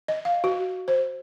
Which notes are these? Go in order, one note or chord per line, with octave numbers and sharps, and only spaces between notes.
D#5
F5
F#4
C5